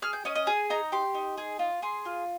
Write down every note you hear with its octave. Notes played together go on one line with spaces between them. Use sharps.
G#4 F6
G5
C#4 D#5
D#5
G#4 G#5
D#4 A#5
G4 C6
D#4
G#4
F4
G#4 C6
F4